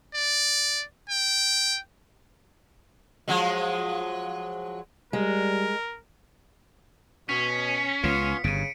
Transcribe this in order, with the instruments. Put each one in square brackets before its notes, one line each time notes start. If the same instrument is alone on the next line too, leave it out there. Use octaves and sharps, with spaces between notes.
[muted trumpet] D5
G5
[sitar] F3 F#3 G#3
[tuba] G3 [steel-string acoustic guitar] G#3 [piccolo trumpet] A#4
[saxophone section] B2 [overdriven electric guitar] C#4 [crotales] B6
[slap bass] C#2 C#3 [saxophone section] B3 F4 [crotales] C#7
[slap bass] G1 G2 [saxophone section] C#3 [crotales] D7 D#7